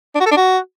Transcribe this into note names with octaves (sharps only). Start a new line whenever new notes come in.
D4
F#4
A4
D4
F#4